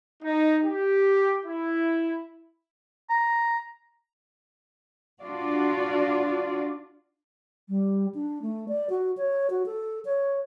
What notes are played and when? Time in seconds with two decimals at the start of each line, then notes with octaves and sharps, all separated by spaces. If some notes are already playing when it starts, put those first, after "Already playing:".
0.23 D#4
0.64 G4
1.44 E4
3.10 A#5
5.21 D4 F4 F#4 D5
7.69 G3
8.15 D4
8.42 A3
8.68 D5
8.90 F#4
9.17 C#5
9.50 F#4
9.66 A4
10.05 C#5